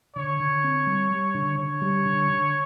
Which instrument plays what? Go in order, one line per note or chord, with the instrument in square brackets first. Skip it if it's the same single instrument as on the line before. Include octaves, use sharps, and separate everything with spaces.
[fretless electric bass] D3 [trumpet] C#5
[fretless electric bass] D3
C4
G3
G3
D3
[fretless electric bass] D3 [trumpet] C#5
[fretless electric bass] G3
D3
D3